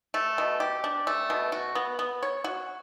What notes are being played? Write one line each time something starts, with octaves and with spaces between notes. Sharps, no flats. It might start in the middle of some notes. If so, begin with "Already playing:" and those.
A3
B2
G4
D4
A3
B2
F#4
B3
B3
C#5
F#4